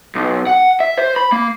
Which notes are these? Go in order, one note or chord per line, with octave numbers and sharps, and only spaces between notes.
B1
F#5
E5
C5
B5
A#3